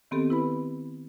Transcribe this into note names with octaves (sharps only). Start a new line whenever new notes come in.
D#3 B3 C4 G4 A4
E4 B4 B5